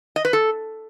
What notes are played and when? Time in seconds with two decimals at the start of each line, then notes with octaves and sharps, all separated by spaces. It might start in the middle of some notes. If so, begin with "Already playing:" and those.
0.16 D#5
0.25 B4
0.33 A4